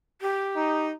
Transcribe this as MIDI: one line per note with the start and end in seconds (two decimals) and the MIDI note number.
0.21 0.86 67
0.57 0.91 63